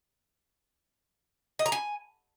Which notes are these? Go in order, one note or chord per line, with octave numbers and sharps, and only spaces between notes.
D#5
A#5
G#5